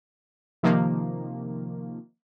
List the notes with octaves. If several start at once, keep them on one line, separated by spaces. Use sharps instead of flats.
C3 D#3 F3 A#3